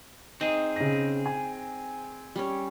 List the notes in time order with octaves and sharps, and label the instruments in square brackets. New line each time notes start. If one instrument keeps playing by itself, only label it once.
[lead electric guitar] C4 G#4 [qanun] D#4
[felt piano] C#3 A#6
G#5
[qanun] G3 C#4 C#5